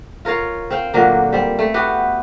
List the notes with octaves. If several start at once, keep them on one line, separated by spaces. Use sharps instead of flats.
F4 A#4 C#5 F5
C4 C5 F5 G5
A#2 D3 F#3 A#3
G3 C4
A3
B3 F#4 G4